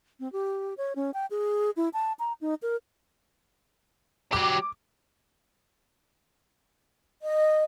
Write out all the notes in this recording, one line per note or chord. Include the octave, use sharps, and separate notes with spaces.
C4
G4
C#5
C#4
G5
G#4
E4
A5
A#5
D#4
A#4
F#3 G4 D6
D#5